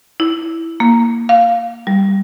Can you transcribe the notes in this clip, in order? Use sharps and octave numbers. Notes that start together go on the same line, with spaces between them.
E4
A#3
F5
G3